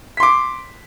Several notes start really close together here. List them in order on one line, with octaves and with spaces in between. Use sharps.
B6 C6 D6